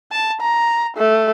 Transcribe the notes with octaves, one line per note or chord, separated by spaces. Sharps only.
A5
A#5
A3